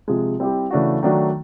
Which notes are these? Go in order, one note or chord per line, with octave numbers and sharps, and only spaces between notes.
C3 F3 G#3
G3 C4 E4 G4
C#3 E3 A3 D4 F#4
D#3 F#3 A3 D4 F#4